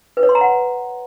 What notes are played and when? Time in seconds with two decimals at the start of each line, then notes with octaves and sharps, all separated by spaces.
0.17 B4
0.23 C#5
0.29 C6
0.35 A#5
0.41 F#5